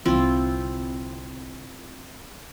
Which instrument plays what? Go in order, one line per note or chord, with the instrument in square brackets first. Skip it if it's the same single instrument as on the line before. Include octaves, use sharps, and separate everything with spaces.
[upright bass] C2 D3 [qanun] C4 E4 F4